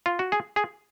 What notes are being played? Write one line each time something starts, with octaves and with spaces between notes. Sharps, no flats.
F4
F#4
G#4
G#4